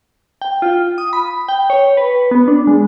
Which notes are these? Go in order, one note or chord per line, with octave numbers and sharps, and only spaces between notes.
G5
F4
D#6
B5
G5
C#5
B4
B3
D4
G#3